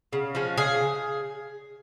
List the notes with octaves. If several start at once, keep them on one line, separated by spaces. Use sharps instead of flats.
C#3
F3 G#3 C#4
C#3 G#4